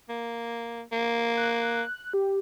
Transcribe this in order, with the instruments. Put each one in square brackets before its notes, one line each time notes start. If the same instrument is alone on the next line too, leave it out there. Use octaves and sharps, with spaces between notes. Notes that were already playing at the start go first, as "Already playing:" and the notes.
[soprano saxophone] A#3
A#3
[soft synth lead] F#6
G4